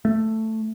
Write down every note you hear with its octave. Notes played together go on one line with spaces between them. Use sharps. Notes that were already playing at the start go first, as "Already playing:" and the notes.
A3